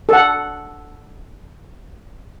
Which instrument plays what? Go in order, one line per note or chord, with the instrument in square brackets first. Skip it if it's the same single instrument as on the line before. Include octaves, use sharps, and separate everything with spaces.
[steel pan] A4 F#5